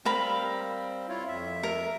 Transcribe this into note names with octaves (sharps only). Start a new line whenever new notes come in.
G3 C4 A#4 F5 B5
E4 F4 C#5
F2 E5
A#4